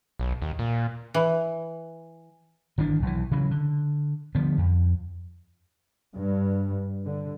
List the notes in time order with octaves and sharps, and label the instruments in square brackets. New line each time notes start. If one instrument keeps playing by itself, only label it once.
[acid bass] B1
D#2
A#2
[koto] E3
[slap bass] G1 D#3 E3 D4
B1 E3
C#3 E3 F#3
D3
D3 F3 G3 B3
F2
[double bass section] G2
D3